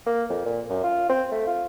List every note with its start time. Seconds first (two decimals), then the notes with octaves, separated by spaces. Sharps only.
0.06 A#3
0.30 F2
0.45 A#2
0.70 F#2
0.84 F4
1.09 C4
1.32 A3
1.47 F4